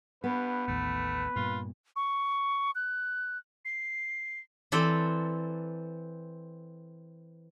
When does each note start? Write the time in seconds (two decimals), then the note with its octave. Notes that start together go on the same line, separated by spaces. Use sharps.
0.24 G2 B3 B4
0.68 A1 D#2 A2 A3
1.36 G2 A#2 F4
1.96 C#6
2.75 F#6
3.65 C7
4.72 E3 C4 A4 D5